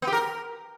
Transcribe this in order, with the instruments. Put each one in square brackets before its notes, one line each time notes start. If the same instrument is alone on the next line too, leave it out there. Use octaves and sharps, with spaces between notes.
[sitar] B3
G4
A#4